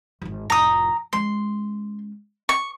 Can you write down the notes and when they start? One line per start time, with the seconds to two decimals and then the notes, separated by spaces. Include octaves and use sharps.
0.22 D#1 G#1
0.50 F1 A2 A#5 D#6
1.13 G#3 C#4 C6
2.49 C#6